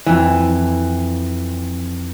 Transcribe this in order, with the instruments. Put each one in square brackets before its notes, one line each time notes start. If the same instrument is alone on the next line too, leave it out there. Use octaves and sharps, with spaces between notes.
[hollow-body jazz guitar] F2 E3